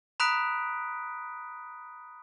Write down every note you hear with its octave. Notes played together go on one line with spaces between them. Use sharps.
A#5 B5 D#6 F#6 B6 D7